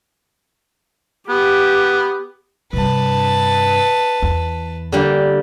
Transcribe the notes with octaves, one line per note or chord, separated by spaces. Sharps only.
B3 G4
G2 C3 B4 A5
E2
D3 G3 A#3